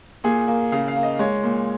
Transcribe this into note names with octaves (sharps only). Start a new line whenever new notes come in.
A#2 G#4
A#3
C#3 F5
F5
A#3
D#5
G#3 C#5
A#2